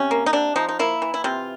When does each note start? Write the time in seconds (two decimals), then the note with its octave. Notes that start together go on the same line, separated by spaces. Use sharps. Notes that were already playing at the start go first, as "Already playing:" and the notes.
Already playing: C3 C#4
0.11 A#3
0.26 D#4
0.33 C3 D4
0.56 F3 D#4
0.69 D#4
0.79 A#3 E4
1.02 E3
1.14 E4
1.24 C3 F4